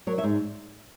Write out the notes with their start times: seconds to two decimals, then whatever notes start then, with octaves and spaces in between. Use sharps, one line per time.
0.07 F#3 A#4 C#5
0.18 C#5 E5
0.23 G#2